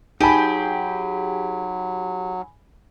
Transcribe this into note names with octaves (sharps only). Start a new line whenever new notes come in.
F#3 D#4 G4 G#4 G#5 A5 B5